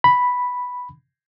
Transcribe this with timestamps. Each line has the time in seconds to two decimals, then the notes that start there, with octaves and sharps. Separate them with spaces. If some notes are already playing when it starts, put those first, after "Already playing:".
0.04 B5